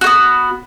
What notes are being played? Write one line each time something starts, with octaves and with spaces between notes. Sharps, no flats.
A3 B3 F#4